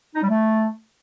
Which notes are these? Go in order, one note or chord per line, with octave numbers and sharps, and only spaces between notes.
D#4
G3
A3